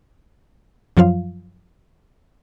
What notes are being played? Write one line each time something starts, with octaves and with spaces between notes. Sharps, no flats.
F#2 F3 F#3 F4 F5